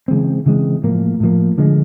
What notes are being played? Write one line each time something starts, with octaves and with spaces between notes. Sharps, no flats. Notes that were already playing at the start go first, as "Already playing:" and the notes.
C#3 E3 G#3 C4
C#3 E3 G#3 C4
A2 F3 A#3
A2 F3 A#3
D3 F3 G#3